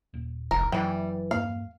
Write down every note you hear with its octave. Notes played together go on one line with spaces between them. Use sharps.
D#1
F1 C2 A#4
F#1 F#2 E3 F#3 G3 G5
E2 G2 A#3 F5